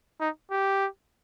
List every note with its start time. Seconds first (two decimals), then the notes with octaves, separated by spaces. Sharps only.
0.20 D#4
0.51 G4